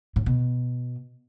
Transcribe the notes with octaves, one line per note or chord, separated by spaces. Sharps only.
A2
B2